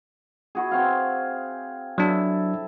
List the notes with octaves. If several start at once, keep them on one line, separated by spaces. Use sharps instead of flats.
E4 F#4 G#4
C4 C#5 F5
F#3 D4 E4 A4 E5